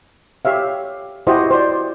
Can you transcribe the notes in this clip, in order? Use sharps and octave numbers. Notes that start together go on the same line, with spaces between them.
G4 C#5 E5 F5
E4 F#4 G4 C5 D#5
C5 D5